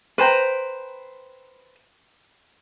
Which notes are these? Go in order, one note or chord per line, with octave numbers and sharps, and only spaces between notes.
B4 C5 G5 A#5